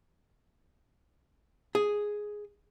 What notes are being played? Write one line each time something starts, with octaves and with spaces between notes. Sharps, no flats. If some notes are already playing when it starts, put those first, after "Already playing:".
G#4